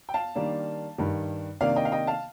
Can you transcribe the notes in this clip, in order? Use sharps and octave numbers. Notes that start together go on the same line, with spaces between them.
G5
F5 A5
D#3 G3 A#3 D4
G2 D#3 G3
C3 D#3 A#3 D4 D5 F5
D#5 G5
F5
D#5 G5
F5 A5